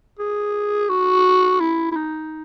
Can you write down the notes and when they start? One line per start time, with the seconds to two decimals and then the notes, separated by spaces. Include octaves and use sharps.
0.19 G#4
0.89 F#4
1.60 E4
1.92 E4
1.96 D#4